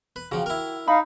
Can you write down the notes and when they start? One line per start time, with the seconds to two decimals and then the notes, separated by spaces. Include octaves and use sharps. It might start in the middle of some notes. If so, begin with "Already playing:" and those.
0.16 B4
0.32 C#3 F3 F#4 G5
0.46 E4 A#4
0.88 D#4 F5 B5